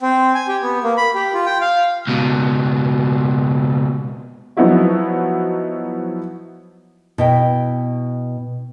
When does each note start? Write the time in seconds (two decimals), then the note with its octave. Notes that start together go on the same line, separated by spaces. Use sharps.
0.02 C4
0.35 G#5
0.48 G4
0.62 B3
0.84 A#3
0.97 B5
1.15 G4
1.34 F4
1.46 G5
1.61 F5
2.07 C#2 B2
4.57 F3 F#3 B3 D#4 E4 F#4
7.18 B2 E4 G5